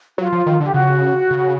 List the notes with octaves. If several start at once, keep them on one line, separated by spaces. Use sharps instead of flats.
F#3 F4
F3
D#3
D3 G4
C#3 F#4
C#3